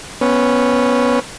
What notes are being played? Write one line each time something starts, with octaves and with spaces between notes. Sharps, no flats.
B3 C#4